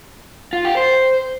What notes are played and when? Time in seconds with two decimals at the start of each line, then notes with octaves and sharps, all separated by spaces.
0.53 F4
0.65 G4
0.77 C5